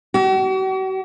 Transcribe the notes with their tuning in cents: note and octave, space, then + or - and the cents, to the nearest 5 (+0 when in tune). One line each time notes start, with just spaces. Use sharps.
F#4 +45